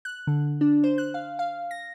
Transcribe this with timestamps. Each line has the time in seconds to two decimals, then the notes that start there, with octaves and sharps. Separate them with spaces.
0.05 F#6
0.27 D3
0.61 D4
0.84 C5
0.98 F#6
1.14 F5
1.39 F5
1.71 A#6